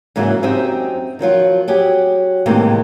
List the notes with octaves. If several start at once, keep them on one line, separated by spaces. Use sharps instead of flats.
G#2 C#3 E3 F#3 A#3 C#4
F#2 C4 D#4 G4 D#5 E5
D#3 F3 F#3 F4
F#3 G4 G#4
A2 C3 D#3 E3 G#3 A#3